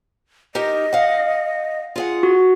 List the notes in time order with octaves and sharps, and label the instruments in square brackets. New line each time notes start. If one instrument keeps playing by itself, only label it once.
[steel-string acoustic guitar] D#4 G4 A#4 [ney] D#5
[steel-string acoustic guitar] F5 F#5
F4 G#4 F#5
[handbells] F#4